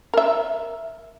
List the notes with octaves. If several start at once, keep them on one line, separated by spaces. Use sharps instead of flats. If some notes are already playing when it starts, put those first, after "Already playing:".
A#4 E5